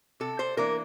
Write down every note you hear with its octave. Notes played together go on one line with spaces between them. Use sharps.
C3 A4
C5
E3 A#3 D4 A#4